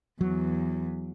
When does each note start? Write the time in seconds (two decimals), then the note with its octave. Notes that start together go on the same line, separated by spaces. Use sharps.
0.21 E2 F#3